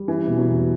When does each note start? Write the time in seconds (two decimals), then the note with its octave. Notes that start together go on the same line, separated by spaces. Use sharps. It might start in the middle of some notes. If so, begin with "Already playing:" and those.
Already playing: G3
0.08 E3 C#4
0.28 B2
0.38 F#3
0.47 E2